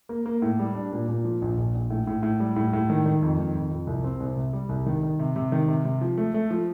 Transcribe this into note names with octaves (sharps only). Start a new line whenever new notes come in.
A#3
A#3
A2
G3
D4
A#2
A#2
F3
A#1
A#1
A#1
A2
A2
A2
G3
A2
A2
D#3
D#3
F2
D#3
F2
F2
C2
C4
C2
C3
G3
C2
D#3
D#3
C3
C3
D#3
C3
C3
F3
A3
A3
F3